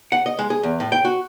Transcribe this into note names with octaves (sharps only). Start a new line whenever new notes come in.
F#5
D#5
G#3
G#4
E2
A2
G5
F#4